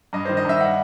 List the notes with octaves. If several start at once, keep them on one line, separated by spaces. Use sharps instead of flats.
G2 D#5
C5
D#3
D#5
G2 E5
F#5